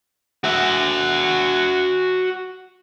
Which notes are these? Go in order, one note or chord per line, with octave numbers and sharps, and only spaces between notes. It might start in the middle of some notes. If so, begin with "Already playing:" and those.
F#4 E5